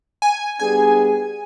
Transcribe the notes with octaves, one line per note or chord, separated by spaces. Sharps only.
G#5
G3 B3 D4 G#4 G#5